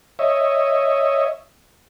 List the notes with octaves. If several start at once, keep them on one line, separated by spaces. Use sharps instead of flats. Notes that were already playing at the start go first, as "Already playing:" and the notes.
C#5 D#5 E5